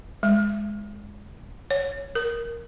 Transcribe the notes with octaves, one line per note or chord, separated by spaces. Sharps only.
G#3
C#5
A#4